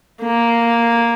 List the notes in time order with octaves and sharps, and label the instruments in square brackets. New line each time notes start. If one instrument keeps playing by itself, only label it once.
[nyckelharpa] A#3